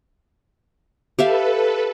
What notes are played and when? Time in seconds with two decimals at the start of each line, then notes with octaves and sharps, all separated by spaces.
1.19 G4 A4 B4 E5 F5